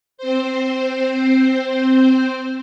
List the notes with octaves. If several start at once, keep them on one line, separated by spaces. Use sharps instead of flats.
C4 C5